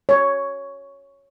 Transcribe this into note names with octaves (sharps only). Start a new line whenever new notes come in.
C#5